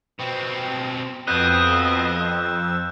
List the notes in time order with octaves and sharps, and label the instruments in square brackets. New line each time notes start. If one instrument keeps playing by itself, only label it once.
[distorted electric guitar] B2 C4
[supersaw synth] F2 E6 [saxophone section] B2 B3 C4 [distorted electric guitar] D#5 [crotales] F#6 G6